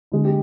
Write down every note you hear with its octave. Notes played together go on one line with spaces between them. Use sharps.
D3 G#3
G4